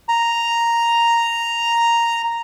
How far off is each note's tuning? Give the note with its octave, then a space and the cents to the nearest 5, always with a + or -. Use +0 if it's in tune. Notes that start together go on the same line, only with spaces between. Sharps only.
A#5 +0